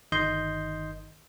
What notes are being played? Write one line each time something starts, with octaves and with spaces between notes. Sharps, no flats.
G1 D#3 D#5 C6 G6